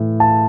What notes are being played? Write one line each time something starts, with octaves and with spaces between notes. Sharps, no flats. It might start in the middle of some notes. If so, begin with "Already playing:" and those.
Already playing: A2 E3
A5